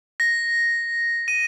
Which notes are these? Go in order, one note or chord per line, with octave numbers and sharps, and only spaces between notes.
A#6
D#7